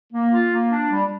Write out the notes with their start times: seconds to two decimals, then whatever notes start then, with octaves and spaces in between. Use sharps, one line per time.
0.12 A#3
0.31 F4
0.51 A#3
0.70 D4
0.90 G3